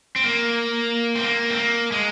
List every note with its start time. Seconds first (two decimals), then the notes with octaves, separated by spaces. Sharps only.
0.16 C4
0.24 A#3
1.15 C4
1.24 A#3
1.50 C4
1.57 A#3
1.92 G#3